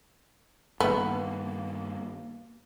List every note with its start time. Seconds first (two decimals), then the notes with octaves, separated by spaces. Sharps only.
0.80 G2 D#3 A#3 B3